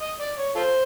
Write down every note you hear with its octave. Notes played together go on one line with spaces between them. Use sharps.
D#5
D5
C#5
F4 A4 C5